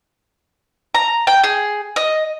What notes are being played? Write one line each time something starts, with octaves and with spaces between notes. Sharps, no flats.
A#5
G5
G#4
D#5